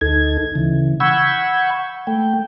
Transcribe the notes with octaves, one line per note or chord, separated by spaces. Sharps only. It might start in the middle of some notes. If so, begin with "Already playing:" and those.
D2 D#4 A4 G#6
C#3 E3
F#5 B5 C#6 E6 G6 G#6
A3 G5